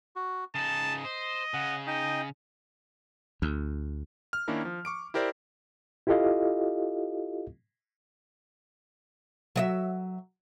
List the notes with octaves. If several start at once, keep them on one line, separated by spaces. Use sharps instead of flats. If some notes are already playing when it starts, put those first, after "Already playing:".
F#4
C#3 D#4 A5 D#6
C5 D#5
C#3 F#5
D#4 D#5 G5
D2
F6
D#3 A#3 C#4 D4 E4 A#4
F3
C#6 D6 D7
E4 G4 A#4 C5 D5 E5
E4 F4 G4 A4 D#5 F5
F#3 D#5 E5